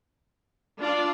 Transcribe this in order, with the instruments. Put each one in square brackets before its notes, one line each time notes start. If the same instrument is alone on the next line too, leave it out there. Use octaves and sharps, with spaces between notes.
[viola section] D4 F4 [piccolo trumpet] D5